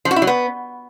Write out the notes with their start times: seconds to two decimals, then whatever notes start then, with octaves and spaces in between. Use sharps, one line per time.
0.05 F3
0.11 F#4
0.16 E4
0.22 F#3
0.27 B3